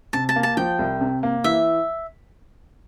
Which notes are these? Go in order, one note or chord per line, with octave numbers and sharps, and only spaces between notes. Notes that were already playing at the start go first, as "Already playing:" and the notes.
C3 A5
A5
A#3
A5
F3 G5
C2
C3
A#3
E3 E5